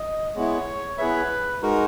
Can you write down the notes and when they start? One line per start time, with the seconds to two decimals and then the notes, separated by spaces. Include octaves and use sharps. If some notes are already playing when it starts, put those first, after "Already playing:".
Already playing: D#5
0.35 G#3 B3 E4 C#5
0.98 B3 E4 G#4 B4 C#5 E5
1.62 G#3 D#4 F#4 A#4